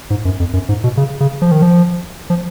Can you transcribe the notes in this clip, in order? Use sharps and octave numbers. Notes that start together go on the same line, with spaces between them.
G#2
F#2
F2
F#2
G#2
B2
C#3
C#3
F3
D#3
F3
F3